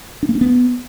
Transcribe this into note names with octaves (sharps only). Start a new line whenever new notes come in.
D4
A#3
D4
B3